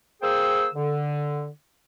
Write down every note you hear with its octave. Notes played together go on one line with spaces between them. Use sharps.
A#3 G#4 C5 G5 E6
D3